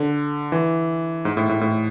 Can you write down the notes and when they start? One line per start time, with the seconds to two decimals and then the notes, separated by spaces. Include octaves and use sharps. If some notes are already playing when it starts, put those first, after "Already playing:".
Already playing: D3
0.52 E3
1.25 G#2
1.37 A2
1.49 A2
1.61 A2